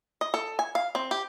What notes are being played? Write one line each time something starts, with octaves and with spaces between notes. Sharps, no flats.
D#5
A4
G#5
F5
C4
G4